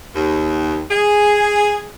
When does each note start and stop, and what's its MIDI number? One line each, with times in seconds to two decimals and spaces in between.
0.16 0.84 39
0.91 1.89 68